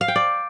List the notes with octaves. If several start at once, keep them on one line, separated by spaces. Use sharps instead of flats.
F5
G5
D5